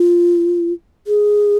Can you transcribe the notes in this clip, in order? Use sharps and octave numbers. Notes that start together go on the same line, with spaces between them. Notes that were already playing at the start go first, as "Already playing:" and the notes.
Already playing: F4
G#4